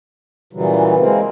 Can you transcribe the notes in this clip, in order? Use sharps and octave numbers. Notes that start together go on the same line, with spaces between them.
A#2 C#3 E3 F#3 G3
G#3 A#3 C4